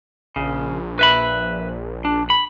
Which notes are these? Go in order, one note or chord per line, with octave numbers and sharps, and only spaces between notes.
A#1 C#3
B4 E5 B5
D4
B5